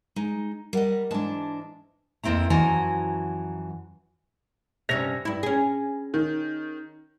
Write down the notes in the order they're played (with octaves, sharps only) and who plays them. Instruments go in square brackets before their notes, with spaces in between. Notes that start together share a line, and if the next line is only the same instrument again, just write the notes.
[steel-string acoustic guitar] G#3 D#4
[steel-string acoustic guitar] G3 D#5 [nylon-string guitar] A#4 F#5
[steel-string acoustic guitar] G#2 E3 A5 [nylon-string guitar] G#3 D4
[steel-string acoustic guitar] F2 A#3 C4 E4 A#5
F#2 E3 F3 F#4 G#5 A#5
[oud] G2 C#4 E5 [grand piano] C3 A#6 F7
[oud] G2 E4 [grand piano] B5
[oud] C#4 G#4
[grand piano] D#3